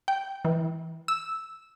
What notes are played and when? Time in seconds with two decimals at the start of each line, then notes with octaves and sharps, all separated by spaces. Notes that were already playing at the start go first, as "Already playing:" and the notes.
0.08 G5
0.45 E3
1.08 E6